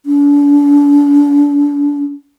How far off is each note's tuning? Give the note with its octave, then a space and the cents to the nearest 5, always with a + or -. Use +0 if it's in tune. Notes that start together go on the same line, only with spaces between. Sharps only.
D4 -35